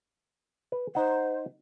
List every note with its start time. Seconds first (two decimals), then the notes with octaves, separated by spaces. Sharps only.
0.72 B4
0.95 D#4 C5 F#5